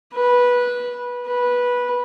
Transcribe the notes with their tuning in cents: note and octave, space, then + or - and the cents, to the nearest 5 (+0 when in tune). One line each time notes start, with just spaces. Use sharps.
B4 -15
B4 -15